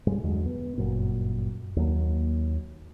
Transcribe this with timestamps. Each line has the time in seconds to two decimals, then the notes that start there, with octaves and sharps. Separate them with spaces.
0.07 G2 B2 G3 G#3
0.24 E2 D3 F#3 G#3
0.46 B3
0.78 G1 F#2 A#2
1.76 D#2 F#3 A#3